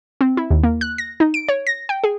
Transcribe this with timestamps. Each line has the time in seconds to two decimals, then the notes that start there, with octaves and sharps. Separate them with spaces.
0.21 C4
0.37 E4
0.51 D#2
0.63 A#3
0.81 F#6
0.98 A#6
1.20 D#4
1.34 D7
1.49 C#5
1.67 A#6
1.89 G5
2.04 G#4